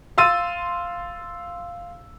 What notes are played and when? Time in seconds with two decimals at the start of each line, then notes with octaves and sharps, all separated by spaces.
0.18 F5 C6 E6 A6 D#7